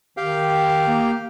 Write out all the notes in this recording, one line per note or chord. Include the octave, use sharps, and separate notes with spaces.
D#3 G4 F5 G5
A#3